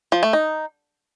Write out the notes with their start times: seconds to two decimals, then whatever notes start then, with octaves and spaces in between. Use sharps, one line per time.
0.12 F3
0.23 A3
0.33 D#4